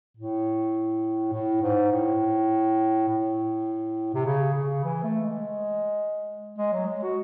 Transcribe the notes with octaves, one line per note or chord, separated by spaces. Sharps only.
A2
A2
G#2
A2
A2
C3
C#3
C#3
E3
A3
G#3
G#3
F#3
G#3
F#4